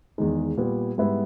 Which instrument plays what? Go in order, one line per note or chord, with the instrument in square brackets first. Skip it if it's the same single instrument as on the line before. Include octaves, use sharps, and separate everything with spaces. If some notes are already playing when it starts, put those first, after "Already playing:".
[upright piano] E2 D#3 G#3 D#4
A#2 G3 B3
G#2 G3 B3 E4